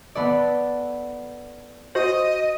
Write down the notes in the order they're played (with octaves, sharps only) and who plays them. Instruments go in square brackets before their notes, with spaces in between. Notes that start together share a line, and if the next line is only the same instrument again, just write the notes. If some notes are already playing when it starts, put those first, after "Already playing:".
[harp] B3 A4 D5
[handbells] F#4 C5 [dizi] D#5 [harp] A#6